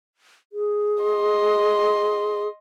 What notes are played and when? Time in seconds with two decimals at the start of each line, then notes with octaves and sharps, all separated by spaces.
0.53 G#4
1.03 D#5 C6